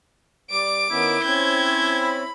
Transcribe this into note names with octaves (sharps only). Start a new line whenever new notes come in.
G3 D5 D6 D7
D#3 B3 C#4 E4
C4 C#4 G6 G#6
B5